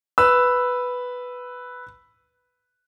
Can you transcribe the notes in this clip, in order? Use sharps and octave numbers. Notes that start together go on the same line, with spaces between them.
B4 E6